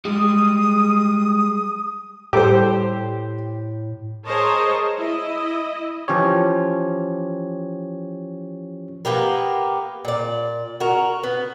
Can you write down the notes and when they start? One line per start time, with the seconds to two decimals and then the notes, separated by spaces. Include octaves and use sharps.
0.05 G3 G#3 D#6
2.33 A2 G3 G4 A4 C5 D6
4.26 G#4 A#4 C5 C#5 D#5 A5
4.97 E4 D#5
6.08 E3 F3 C#4 G4 C#5
9.05 A#3 B3 G4 A#4
10.05 A#2 D5
10.80 F#4 A#4
11.23 B3